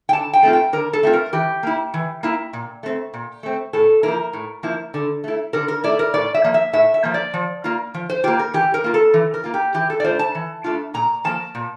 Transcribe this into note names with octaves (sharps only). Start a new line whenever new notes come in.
G5
D3 A5
G5
A3 C4 F4
G5
D3 A#4
A4
A3 C4 F4
A#4
E3 G4
A#3 E4
E3
A#3 E4
A#2
A3 C4
A#2
A3 C4
A2 A4
F3 A#3 E4 A#4
A2
F3 A#3 E4
D3
A3 E4
D3 A#4
A#4
A3 E4 D5
A#4
A2 D5
E5
F3 A#3
E5
A2 E5
E5
F3 A#3
D5
F3
A#3 F4
F3
C5
A#3 F4 G4
A#4
E3 G4
A#4
A#3 F4
A4
E3
A#4
A#3 F4
G4
E3 G4
A4
D5
A3 D4 F4 C5
A5
E3
A3 D4 F4
A#2 A#5
F3 A#3 A5
A#2